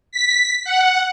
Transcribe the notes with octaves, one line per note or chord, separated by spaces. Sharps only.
B6
F#5